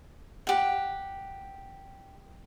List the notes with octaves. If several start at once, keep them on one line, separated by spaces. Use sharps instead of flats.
G4 F#5